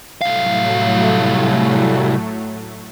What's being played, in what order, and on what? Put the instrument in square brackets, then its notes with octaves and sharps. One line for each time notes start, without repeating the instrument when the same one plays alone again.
[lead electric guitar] C2 F5 [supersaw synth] A2 F#3 A3